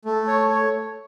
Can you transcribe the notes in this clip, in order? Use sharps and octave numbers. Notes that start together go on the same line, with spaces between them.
A3
C#5
C#5